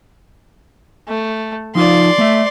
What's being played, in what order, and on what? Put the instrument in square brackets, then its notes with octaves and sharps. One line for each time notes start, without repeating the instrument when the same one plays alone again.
[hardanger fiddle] A3
[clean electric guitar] F3 D#4 F4 [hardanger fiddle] D5 C6
[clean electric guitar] A3 E5